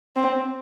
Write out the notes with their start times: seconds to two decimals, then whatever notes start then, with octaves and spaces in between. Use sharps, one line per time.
0.16 C4